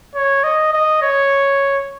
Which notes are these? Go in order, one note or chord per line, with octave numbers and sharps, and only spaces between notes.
C#5
D#5
D#5
C#5